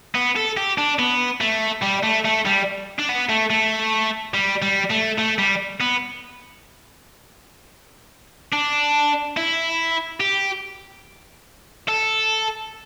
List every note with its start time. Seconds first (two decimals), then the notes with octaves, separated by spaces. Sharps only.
0.15 B3
0.36 A4
0.57 G4
0.78 D4
0.99 B3
1.41 A3
1.83 G3
2.03 A3
2.25 A3
2.45 G3
2.99 D4
3.09 B3
3.29 A3
3.50 A3
4.34 G3
4.62 G3
4.90 A3
5.18 A3
5.38 G3
5.80 B3
8.53 D4
9.37 E4
10.20 G4
11.88 A4